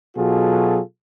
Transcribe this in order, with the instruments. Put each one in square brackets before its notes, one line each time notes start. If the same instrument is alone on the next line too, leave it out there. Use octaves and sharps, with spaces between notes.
[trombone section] B2 F#3 F4 G#4 A4